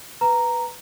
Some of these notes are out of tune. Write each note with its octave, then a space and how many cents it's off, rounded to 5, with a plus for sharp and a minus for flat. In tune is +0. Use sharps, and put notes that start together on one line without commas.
B4 +0 A#5 +0